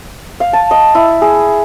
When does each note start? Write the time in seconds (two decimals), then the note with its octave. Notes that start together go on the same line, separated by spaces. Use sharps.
0.40 F5
0.53 A5
0.71 D#5
0.95 E4
1.22 G#4